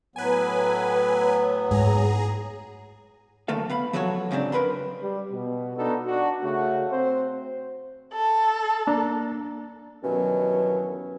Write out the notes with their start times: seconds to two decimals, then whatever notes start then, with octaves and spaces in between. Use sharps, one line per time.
0.16 A2 F#3 B3 B4 G#5
1.71 G#2 G#4 A#5
3.48 F#2 D3 A3 A#3 A4 F5
3.69 B3 F5 B5
3.93 F3 F#3 F#4 A4 C#5
4.31 G#2 C#3 F#3 C4 D4
4.52 F#2 A#4 B4 B5 C6
5.02 G3
5.33 B2
5.77 B3 D4 D#4 F4 F#4 A4
6.06 D4 F#4
6.42 C#3 A3 F#4
6.91 C4 C5
8.13 A4
8.87 A#3 D4 A#5
10.03 G2 B2 D#3 E3 F#3 C#4